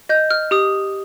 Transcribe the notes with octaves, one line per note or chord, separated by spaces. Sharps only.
D#5 G6
F6
G4 D#6